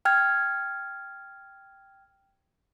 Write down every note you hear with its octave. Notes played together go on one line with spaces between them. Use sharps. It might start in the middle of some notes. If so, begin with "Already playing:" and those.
G5 F6 G#6